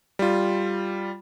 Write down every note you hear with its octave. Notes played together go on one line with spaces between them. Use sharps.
G3 F4